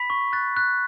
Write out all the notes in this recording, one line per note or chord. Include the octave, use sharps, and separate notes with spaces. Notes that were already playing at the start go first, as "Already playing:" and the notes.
Already playing: B5 B6
C#6
F#6 A6
F#6